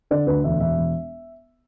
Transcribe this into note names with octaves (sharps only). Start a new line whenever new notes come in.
D3 D5
D2 B4
E1 E5
E1 E5
E1